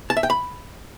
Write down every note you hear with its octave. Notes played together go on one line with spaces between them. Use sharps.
A5
E5
G5
B5